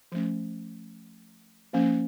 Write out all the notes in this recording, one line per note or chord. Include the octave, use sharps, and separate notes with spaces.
F3 A3 C#4
F3 A#3 C#4